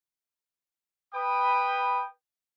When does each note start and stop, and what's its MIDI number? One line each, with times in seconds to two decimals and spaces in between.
1.14 2.04 71
1.14 2.04 79
1.14 2.04 83
1.14 2.04 87